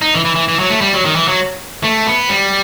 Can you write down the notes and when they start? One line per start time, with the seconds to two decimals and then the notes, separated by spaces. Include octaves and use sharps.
0.02 D#4
0.14 E3
0.25 E3
0.36 E3
0.48 E3
0.59 F#3
0.70 A3
0.81 G3
0.94 F#3
1.05 D#3
1.16 E3
1.28 F#3
1.84 A3
2.07 B3
2.29 G3